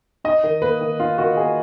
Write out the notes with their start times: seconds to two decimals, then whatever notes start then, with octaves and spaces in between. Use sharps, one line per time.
0.24 D#4 D#5
0.44 D#3
0.62 A#3 B4
0.81 D#3
1.00 D#4 F4
1.18 D#3 F#4
1.36 A#3 G#4